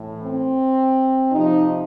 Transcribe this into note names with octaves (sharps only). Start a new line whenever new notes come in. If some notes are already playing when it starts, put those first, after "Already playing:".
Already playing: A2 E3
C4
C3 F3 D#4